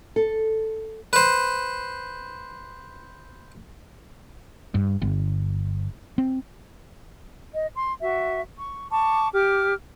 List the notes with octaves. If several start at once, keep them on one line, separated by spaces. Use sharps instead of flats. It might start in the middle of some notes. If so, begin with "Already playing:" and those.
A4
B4 C5
G2
G1
C4
D#5
C6
F#4 E5
C#6
A5 C#6 D6
G4 D6 F6